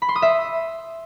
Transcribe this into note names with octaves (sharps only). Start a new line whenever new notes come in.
B5
C6
D#6
E5